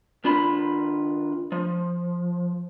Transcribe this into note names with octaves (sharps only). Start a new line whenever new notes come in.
D#3 D4 F4 B5
F3